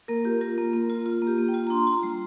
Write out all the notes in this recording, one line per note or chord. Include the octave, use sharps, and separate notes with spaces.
A#3 A#4
F4 G4
F4 A#4
A#3
A#3
F4
F4
A#3
G4
A#3
G5
F4
A#5
D4 C6
F4
A#5
G3